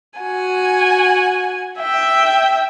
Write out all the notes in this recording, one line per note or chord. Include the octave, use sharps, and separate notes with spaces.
F#4 G#5
E5 G5